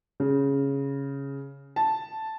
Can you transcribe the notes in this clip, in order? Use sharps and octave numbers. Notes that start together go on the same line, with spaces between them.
C#3
A5